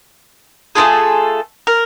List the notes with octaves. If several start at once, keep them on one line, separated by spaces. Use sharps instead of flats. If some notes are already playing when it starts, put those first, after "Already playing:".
A3 C4 F4 G#4 A4
A#4